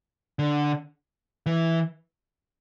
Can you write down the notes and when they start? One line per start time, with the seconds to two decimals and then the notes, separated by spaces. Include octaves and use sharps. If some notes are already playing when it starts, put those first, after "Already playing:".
0.39 D3
1.46 E3